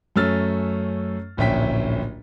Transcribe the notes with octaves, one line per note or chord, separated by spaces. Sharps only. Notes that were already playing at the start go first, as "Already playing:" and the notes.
F#2 A3 C#4 E6 F6 A6
D1 A#1 C#4 E5 G5 B6